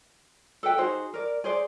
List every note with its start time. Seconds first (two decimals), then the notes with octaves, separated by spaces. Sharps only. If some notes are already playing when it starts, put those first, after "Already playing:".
0.63 A4 B4 G5
0.78 D#4 F#4 G#4 C5
1.14 A#4 D5
1.44 G#4 C5 D5